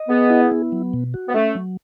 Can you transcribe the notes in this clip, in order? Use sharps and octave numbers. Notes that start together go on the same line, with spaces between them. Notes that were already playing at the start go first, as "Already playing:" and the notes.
Already playing: D#5
B3 G#4
E4
B3
F#3
B2
F#4
B3
A3 C#4
F#3